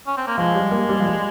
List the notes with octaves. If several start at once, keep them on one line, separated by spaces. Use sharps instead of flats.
C#4
C4
A#3
F3 G#3
G3
A#3
G3
F3
G3